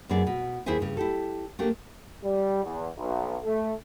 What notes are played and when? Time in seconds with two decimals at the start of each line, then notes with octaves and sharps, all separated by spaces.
0.09 F#2 B3 E4 G#4 D5
0.27 B2
0.66 D#2 E4 G#4 C5 E5 G#5
0.80 G2 C#3
0.97 E4 G4 A4
1.59 A3 A#3 D4 G4
2.23 G3
2.64 E2
2.97 B1
3.43 A3